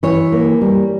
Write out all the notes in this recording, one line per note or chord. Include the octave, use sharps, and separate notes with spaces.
E3 C#5
A#3
G3